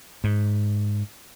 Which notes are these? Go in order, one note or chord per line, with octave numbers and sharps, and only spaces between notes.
G#2